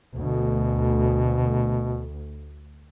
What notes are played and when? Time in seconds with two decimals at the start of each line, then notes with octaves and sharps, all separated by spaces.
0.15 D2 B2